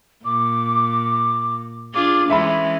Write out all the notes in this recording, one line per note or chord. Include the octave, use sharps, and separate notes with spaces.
A#2 D6
D4 F4 G#4 D6
E3 G#3 C#4 E5 B5 C6